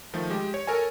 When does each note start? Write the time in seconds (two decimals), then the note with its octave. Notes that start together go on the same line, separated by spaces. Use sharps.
0.13 D#3 F3 A3
0.30 G#3 G4
0.54 C#5
0.67 A4 A#4 C#5 G#5